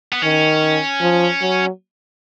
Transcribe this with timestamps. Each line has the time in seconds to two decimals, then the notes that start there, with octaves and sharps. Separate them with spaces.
0.12 B3
0.22 D#3 C#4
1.01 F3
1.42 F#3